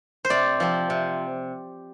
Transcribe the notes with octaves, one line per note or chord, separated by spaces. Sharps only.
C5
C3 D5
F3 C4
C3